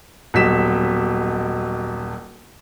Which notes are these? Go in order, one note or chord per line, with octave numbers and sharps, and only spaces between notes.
D#1 B1 F#3 B6 E7